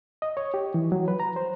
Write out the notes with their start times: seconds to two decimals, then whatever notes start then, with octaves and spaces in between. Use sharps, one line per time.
0.22 D#5
0.37 C#5
0.54 G4
0.74 E3
0.92 F#3
1.08 B4
1.20 A#5
1.36 C5